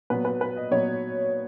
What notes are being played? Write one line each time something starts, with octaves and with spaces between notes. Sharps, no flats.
A#2 F#3 B3 B4
B4
B4
D#5
A#2 F#3 B3 C#5